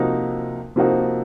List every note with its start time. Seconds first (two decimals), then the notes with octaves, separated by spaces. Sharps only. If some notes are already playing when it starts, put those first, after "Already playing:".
Already playing: C3 F3 A#3 D#4 F#4
0.76 C3 F3 A#3 D#4 F#4